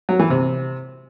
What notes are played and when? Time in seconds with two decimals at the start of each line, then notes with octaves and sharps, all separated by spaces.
0.09 F#3
0.19 E3
0.30 C3